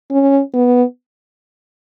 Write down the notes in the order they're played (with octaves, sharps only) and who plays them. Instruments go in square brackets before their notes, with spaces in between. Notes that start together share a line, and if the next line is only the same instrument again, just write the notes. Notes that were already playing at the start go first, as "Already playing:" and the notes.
[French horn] C#4
B3